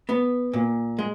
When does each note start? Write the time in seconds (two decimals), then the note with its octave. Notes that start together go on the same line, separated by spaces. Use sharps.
0.09 B3
0.53 A#2
0.99 G#3